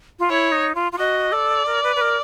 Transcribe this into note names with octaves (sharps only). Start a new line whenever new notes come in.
F4
E4 C#5
D#4
F4
F4
F#4 D#5
A4 D5
A#4
B4
B4
A#4